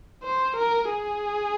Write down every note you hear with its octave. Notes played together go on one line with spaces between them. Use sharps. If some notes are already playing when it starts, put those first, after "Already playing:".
C5
A#4
G#4